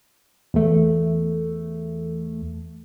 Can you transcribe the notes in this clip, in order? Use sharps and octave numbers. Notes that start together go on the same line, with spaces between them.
E2 A3